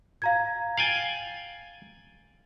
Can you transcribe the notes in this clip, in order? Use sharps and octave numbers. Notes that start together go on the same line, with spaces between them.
F5 A#5 G#6
F5 G5 G#5 A6 F#7